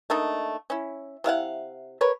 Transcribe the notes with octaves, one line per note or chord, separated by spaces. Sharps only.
A3 A#3 D4 D#4
C#4 E4
C3 E4 F5 F#5
A#4 B4 C#5